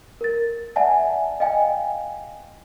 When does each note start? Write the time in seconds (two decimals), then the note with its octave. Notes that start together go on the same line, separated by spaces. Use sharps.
0.21 A#4 A6
0.76 D5 E5 F#5 G#5 A5
1.40 D#5 F5 G5 G#5